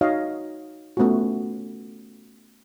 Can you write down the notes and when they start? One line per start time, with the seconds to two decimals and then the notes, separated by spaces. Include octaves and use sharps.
0.01 D#4 F#4 C#5 D#5 F5
0.97 A3 B3 C#4 F4 F#4